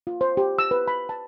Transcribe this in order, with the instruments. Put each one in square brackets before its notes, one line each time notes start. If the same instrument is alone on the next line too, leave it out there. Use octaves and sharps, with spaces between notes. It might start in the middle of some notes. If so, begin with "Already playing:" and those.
[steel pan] F4
C5
G4
E6
B4
B5
A5